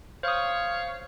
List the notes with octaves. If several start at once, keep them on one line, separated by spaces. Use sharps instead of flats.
C5 C#5 F5 D#6